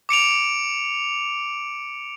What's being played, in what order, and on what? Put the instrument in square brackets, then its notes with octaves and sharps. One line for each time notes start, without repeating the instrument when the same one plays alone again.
[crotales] D6 C#7 D7 F7